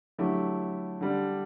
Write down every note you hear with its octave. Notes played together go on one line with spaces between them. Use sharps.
D3 F#3 A3 E4 G4
D3 G3 D4